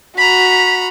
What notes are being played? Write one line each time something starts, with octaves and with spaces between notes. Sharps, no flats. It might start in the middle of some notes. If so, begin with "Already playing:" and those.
F#4 A#5 B5 B6